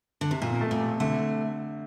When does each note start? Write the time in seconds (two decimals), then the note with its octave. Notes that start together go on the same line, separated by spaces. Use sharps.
0.21 D3
0.31 C3
0.41 F2 A#2
0.61 A3
0.71 A#2
0.80 C3
1.00 D3 A3